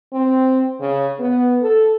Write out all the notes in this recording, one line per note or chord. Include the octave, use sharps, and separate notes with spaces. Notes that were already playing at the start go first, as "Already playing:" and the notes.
C4
C#3
B3
A4